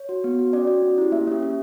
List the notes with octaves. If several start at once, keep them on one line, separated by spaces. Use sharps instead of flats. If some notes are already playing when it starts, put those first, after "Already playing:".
Already playing: C#5
F#4
B3
F#4
C#4 D5
F#4
C#4
E4 G4
A#3 E5
C#4 G4
C#4